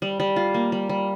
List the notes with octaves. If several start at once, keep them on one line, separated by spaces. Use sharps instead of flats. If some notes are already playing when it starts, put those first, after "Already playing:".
G3
G3
F4
A#3
G3
G3